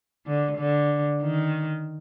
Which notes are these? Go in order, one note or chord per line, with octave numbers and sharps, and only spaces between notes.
D3
D3
D#3